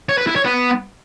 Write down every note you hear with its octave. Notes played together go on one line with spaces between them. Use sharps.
C#5
B4
E4
C#5
B3